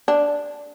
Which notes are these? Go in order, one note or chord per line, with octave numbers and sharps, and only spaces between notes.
D4